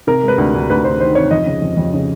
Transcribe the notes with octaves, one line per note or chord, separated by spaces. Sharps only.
C3 A#4
G#3
B4
D2
D2
D2 B4
D2 C5
D#3 C5
C3 C#5
F2 D#5
C#3
F2
F2
C#3